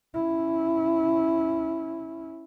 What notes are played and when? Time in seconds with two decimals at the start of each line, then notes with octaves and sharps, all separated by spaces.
0.14 C#4 E4